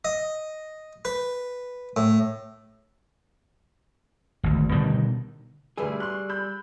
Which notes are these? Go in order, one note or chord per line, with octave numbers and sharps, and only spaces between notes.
D#5
B4
A2
G#1 D2
B2 D3 D#3 G3
D2 G3 G#4 B4 E6
C6 C#6 F#6
B5 E6 G6